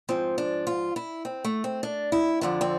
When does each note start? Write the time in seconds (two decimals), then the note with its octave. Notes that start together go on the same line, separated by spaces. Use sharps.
0.09 G#2 F3 C4
0.38 D4
0.67 F4
0.96 E4
1.25 C4
1.44 A3
1.64 C4
1.83 D4
2.12 E4
2.41 F2 D3 F3 D4
2.61 C4